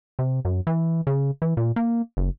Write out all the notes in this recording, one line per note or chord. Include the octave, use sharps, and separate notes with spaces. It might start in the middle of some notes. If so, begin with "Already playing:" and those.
C3
F#2
E3
C#3
E3
A#2
A#3
F#1